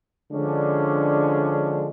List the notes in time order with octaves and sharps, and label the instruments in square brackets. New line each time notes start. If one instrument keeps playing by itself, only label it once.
[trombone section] D3 F3 G#3 C#4 D4